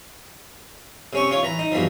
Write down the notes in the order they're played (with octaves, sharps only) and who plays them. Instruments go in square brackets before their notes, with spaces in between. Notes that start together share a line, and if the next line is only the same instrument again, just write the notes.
[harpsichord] C3 C#4 C#6
F4 C#5
E3 A#5
D#4
G2 B2 E3 F3